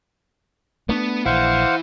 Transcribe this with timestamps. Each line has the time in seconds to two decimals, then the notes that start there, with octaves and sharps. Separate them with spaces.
0.89 A3 B3 C#4 D4
1.26 A#1 E3 E4 C5 F5 F#5